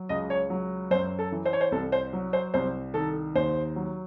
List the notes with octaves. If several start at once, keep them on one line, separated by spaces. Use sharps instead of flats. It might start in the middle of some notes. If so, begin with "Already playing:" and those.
Already playing: F#3
C#2 D#5
C#5
F#3
F#2 C5
A4
E3
C5
C#5
C5
C2 A4
C5
F#3
C5
C2 C5
D#3 A4
D#2 C5
F#3